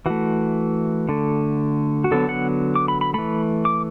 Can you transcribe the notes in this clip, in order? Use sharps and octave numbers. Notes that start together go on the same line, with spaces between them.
E3 A3 F#4
D3 A3
F#4
D3 F#3 B3 A4
F#5
D6
B5
B5
E3 A3 B5
D6